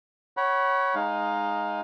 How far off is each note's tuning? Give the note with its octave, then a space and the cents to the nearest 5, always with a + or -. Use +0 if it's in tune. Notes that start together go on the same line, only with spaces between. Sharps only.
C#5 +0 F#5 +30 B5 -25
G#3 +0 D#4 +0 F5 +20